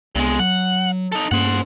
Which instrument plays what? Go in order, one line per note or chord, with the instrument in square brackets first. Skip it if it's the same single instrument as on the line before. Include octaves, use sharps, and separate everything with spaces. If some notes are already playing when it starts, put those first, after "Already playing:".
[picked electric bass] C2 B3 [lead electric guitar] G2 G#3
[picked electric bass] F#3 [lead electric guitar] F#5
[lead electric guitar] D#4 A4
[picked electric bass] G2 A#3 C#4 [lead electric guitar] C5 F#5